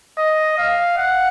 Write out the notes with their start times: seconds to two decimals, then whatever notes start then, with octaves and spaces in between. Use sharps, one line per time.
0.18 D#5
0.58 F5
0.97 F#5